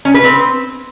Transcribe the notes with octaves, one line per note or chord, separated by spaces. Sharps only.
C#4
B4
C4